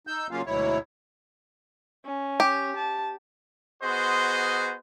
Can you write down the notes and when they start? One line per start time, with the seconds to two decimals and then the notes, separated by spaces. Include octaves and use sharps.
0.07 D#4 E6 G6
0.31 C#3 F#3 A#3 C#4 F4 F5
0.46 D2 G#2 B2 F#3 E4 C#5
2.05 C#4
2.40 G4
2.76 A5
3.82 B3 F#4 G#4 C5 D#5 C6